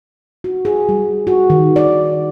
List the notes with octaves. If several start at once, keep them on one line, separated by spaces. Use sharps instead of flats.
F#4
G#4
G3
F#4
D#3
D5